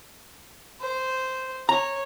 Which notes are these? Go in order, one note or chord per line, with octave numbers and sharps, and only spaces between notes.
C5
C#5 A#5